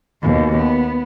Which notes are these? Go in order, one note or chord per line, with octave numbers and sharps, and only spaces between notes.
D#2 B2
B3